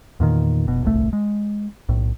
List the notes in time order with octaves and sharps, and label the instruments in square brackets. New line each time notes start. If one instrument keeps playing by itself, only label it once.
[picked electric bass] E2 A#2 D#3
F1 B2
D1 G1 C2 A3
G#3
B1 A2